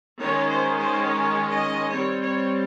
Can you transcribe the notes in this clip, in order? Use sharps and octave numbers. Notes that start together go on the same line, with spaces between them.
D#3 G#3 C#4 C#5
C5
C5
C#5
D#5
G3 C4 C#5
C#5